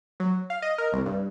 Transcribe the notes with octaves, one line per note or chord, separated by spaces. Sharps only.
F#3
F5
D#5
A#4
C2
G2